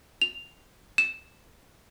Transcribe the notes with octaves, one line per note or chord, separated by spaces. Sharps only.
F7
E7